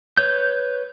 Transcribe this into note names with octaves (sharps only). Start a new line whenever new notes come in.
B4 C#5 G6